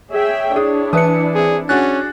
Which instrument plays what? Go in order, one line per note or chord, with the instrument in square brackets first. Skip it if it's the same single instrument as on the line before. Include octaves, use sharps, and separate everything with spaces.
[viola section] G#4 E5 G5 [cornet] C#5
[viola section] D4 E4 [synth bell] G#4 [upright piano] D#6
[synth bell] E3 B4 C#7 [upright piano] E5 A5 D#6
[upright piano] C4 [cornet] G#4
[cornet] C#4 [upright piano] D4 F#4 G#4 [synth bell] F#6 A6